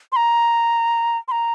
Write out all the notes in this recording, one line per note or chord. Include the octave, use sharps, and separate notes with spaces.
C6
A#5
C6
A#5